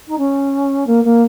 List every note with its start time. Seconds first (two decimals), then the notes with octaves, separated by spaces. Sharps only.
0.08 D#4
0.18 C#4
0.87 A#3
1.04 A#3